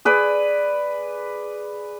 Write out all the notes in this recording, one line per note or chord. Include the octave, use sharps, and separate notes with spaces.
G#4 B4 D5